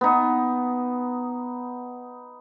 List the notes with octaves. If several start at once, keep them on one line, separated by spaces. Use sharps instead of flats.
B3 D#4